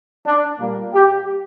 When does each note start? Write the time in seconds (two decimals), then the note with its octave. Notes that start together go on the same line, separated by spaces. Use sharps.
0.26 D4
0.60 A#2 G3 A#3
0.94 G4